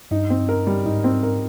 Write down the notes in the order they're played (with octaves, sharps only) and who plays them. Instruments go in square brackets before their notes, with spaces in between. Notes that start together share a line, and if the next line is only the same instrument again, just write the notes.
[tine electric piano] G2 [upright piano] D#4
[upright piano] C4
A#4
G3
[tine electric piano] G#2 [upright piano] D#4
[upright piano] C4
A#4